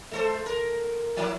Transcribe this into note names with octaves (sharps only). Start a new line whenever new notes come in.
G#3 A4 C5
A#4
F3 A#3 E4